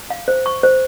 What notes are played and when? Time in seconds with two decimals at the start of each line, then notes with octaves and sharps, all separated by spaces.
0.10 F5
0.28 C5
0.46 C#6
0.63 C5